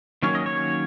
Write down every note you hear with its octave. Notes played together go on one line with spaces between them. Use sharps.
D#3 F#3 A#3 C#4 C#5
D#5
C#5